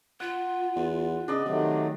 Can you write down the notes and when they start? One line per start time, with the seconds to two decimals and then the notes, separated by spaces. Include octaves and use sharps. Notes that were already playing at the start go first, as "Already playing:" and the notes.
0.20 F4 F#5
0.76 E2
1.28 C#3 D4 D5 D#5
1.46 C3 D#3 F#3 A3